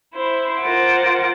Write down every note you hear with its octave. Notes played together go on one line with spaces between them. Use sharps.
E4 C5
F4 A#4 C5 F#5 D6